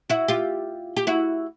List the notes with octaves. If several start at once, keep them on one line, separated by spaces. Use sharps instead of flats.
E4 F#4
F4 G4
G4
E4 F#4